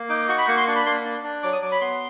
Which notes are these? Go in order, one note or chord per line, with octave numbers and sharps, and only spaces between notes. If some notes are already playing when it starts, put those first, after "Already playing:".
Already playing: A#3
D#4 D6
F#4 C#6
B5
A#3 C#6
C6
D4 C#6
B5
A#3 C6
D4
D4
F#3 D6
D#6
F#3 D6
B5
B3 C6